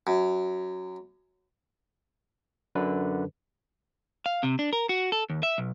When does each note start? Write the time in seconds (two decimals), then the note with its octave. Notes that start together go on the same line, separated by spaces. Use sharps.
0.07 F#2
2.75 F#2 D3 B4
4.26 F5
4.43 C3
4.59 D4
4.73 A#4
4.89 F#4
5.12 A4
5.30 D#2
5.43 E5
5.58 B1